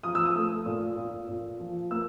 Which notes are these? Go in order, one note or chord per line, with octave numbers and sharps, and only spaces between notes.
F3 D#6
E6
D#6
A3
A#2
A#2
A#2
F3
A#3 E6